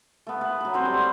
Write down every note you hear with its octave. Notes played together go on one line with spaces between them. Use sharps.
A3 B3
B4
F#3 B4
B3 C4 B4 C5
G3
A3